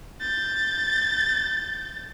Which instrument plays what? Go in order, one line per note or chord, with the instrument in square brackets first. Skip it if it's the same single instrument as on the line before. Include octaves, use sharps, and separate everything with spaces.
[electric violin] G6 A6